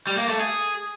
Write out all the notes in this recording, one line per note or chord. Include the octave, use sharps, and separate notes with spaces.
G3
A#3
A3
G#4